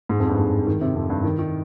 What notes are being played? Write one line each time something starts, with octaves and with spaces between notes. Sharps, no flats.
G#2
F2
G2
G#2
D#3
C3
F2
G2
D#3
D#3